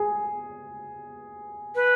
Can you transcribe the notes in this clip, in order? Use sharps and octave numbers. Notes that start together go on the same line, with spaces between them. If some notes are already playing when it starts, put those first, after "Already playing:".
Already playing: G#4
B4